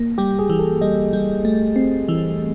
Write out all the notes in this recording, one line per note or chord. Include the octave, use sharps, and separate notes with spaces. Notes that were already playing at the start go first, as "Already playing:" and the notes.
Already playing: A#3
G3 G4
G#4
E3
A4
G3 D#5
G3
A3
C4
E3